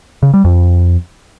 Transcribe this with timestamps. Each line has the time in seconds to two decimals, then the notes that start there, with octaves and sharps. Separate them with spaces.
0.23 C#3
0.34 G3
0.44 F2